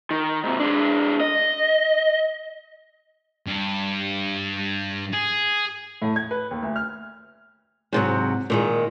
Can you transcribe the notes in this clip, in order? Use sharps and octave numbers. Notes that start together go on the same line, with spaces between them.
D#3
G#2 C3
G#3 D4
D#5
G2
G#4
A2
G#6
B4
D#2
D2
F6
G#2 C3 F#3
A#2 D#3 G#3